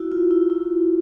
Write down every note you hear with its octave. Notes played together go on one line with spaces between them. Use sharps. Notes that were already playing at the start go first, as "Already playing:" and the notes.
Already playing: E4 F#4
F4
E4
E4